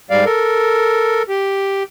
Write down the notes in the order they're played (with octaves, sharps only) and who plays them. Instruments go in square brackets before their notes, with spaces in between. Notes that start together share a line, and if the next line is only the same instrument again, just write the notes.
[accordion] G#2 G3 D5 F5
A4 A#4
G4